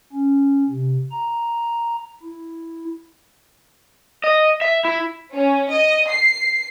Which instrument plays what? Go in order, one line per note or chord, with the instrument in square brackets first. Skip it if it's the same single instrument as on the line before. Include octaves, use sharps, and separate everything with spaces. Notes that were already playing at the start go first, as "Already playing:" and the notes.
[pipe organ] C#4
C3
A#5
E4
[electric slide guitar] D#5
E5
E4
[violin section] C#4
D#5
C7